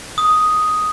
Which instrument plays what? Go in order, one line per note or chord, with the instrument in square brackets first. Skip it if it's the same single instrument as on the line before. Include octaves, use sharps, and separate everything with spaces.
[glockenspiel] D#6